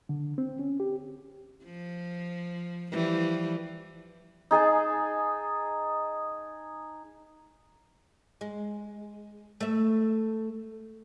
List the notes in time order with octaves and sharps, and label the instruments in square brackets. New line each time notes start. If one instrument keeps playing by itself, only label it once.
[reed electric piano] D3
C4
C#4
G4
[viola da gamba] F3
E3 F3 G3
[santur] D#4 G#4 G#5 A5
[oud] G#3
A3 E5